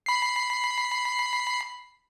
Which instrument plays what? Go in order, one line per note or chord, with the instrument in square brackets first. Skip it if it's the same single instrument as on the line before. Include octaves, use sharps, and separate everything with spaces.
[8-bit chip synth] B5 C7